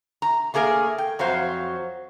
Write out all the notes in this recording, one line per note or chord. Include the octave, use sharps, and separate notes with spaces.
A#5
A3 A#3 G#4 A#4
G5
F2 F#3 F#4 C5 F5